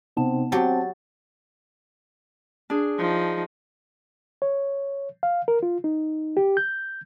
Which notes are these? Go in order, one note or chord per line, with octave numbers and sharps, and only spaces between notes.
C3 B3 C4 D#4 A5
F#3 C4 F#4 G4 A5 A6
D4 G#4
F3 D#4
C#5
F5
A#4
F4
D#4
G4
G6